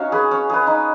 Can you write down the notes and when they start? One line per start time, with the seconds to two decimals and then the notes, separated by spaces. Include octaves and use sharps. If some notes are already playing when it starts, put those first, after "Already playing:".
Already playing: C#4 D#4 F#4 C#5 F5
0.12 G#4 B4
0.31 C#4
0.50 G#4 B4
0.67 D#4